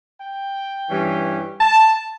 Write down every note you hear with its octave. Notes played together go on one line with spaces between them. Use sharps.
G5
G2 E3 G3 C#4
A5